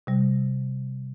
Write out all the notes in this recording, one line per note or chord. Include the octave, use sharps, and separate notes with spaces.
C3 G3